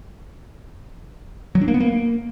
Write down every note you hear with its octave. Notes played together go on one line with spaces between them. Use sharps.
F#3
D4
A#3
B3
A#3